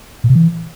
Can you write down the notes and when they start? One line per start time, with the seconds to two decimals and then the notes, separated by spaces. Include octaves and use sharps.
0.24 A#2
0.30 C3
0.35 E3